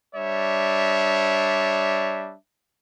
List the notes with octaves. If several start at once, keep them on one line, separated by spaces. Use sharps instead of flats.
G3 D4 C#5 E5